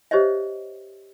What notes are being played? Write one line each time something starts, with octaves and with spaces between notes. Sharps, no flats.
G4 C5 C#5 D#5 E5